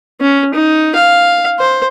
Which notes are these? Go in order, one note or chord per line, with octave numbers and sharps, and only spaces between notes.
C#4
D#4
F5
C5